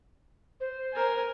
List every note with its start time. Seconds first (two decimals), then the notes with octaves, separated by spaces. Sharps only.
0.60 C5
0.93 A#4 G#5